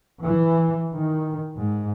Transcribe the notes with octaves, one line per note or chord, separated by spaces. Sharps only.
E3
D#3
G#2